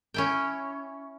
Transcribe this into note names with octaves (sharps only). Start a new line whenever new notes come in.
C#4 E4 G5